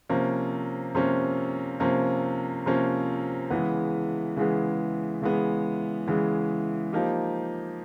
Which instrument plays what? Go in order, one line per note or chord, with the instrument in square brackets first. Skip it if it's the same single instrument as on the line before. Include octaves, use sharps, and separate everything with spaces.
[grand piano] C3 F3 A#3 C#4
C3 F3 A#3 C#4
C3 F3 A#3 C#4
C3 F3 A#3 C#4
C#3 E3 G#3 B3
C#3 E3 G#3 B3
C#3 E3 G#3 B3
C#3 E3 G#3 B3
F3 A#3 D#4 G4